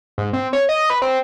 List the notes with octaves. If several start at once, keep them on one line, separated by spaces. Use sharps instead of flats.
G#2
C4
C#5
D#5
B4
C4